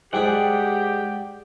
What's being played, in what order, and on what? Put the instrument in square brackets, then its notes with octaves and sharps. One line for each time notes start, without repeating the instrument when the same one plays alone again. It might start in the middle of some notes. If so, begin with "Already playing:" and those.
[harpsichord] G#2 G#4 B5 [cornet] G4 [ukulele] C5 G5 [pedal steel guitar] D5 F#5